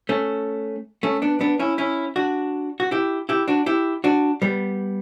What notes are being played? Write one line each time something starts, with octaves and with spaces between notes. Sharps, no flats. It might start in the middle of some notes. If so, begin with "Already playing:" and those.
A3 C#4
A3 C#4
B3 D4
B3 D4
C#4 E4
C#4 E4
D4 F#4
F#4
E4 G4
E4 G4
D4 F#4
E4 G4
D4 F#4
G3 B3